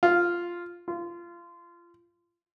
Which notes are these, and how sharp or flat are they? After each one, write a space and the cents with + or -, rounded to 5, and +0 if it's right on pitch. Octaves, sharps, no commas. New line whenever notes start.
F4 -5
F4 -25